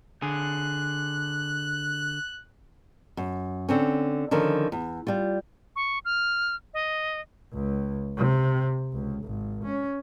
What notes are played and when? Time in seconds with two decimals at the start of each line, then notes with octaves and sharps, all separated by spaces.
0.22 D3 G#4 F#6
3.17 F#2
3.69 D3 C4 C#4
4.31 D3 D#3 F3 C#4
4.72 E2
5.07 G3 F4
5.76 C#6
6.05 F6
6.74 D#5
7.52 C#2
8.17 C3
8.92 C#2
9.24 G#1
9.63 C#4